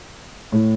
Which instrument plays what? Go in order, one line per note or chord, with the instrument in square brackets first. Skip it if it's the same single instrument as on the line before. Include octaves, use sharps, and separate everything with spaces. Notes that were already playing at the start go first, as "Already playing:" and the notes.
[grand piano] A2